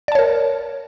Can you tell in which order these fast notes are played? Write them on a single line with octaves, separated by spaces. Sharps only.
D5 A5 C#5 A#4